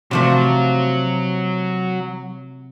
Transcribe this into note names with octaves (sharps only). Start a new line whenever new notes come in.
C3 F3 F#3 A3